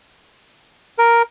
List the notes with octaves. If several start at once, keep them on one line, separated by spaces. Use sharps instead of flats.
A#4